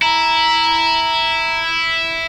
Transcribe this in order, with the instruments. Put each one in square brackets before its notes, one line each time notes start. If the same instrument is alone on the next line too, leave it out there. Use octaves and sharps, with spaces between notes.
[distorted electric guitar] E4 [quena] A#5